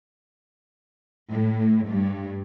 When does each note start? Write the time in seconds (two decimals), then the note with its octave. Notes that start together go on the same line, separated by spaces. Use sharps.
1.32 A2
1.89 G2